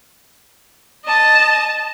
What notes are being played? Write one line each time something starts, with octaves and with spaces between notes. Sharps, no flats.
D#5 A5